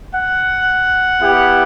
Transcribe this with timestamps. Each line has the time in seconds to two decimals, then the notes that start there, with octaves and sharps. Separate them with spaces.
0.13 F#5
1.20 B3 E4 G4